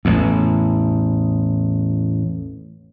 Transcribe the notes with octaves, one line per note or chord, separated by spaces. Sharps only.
A1 E2